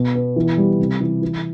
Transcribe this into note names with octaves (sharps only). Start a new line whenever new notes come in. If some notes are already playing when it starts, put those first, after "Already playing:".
Already playing: B2
B3
E3
G3
C3
E3
E3